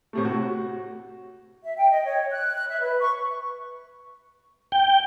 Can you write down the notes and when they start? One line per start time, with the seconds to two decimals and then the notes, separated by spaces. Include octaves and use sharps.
0.13 A2 C3 A3
0.25 F#4
1.64 E5
1.77 G5
1.91 D#5
2.05 C#5
2.31 F#6
2.56 F#6
2.70 E5
2.81 B4
3.00 C#6
4.72 G5